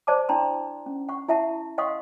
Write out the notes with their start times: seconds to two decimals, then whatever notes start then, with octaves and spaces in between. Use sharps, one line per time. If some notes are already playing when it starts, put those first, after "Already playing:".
0.07 C5 D5 A5 D6
0.29 D4 E4 A5 A#5 C6
0.86 C#4
1.09 F#5 C#6
1.28 E4 E5 F#5 A5
1.78 D#5 F5 F#5 C6 C#6 D#6